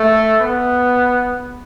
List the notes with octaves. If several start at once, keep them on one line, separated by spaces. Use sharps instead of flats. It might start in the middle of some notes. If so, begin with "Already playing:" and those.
Already playing: A3
B3